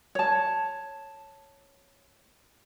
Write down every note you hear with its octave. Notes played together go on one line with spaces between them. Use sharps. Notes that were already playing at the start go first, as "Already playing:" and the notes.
C#5 A5